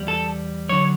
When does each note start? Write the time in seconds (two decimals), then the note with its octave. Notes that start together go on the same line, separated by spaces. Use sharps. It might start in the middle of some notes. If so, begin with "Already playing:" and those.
Already playing: E2 G3
0.08 A4
0.69 D3 F#3 C#5